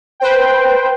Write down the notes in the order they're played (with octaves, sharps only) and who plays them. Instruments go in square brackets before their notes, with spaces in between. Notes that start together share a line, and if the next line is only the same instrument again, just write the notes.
[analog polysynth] B4 C5 G5